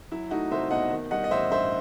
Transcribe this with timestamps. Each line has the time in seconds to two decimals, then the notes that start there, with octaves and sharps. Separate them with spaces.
0.12 F#3 E4
0.31 A3 D#4 F#4
0.51 C2 C5 E5
0.71 B2 D#5 F#5
0.91 D#3
1.11 G3 D#5 F#5
1.24 D#5
1.31 A1 C5 E5
1.50 G2 C5 E5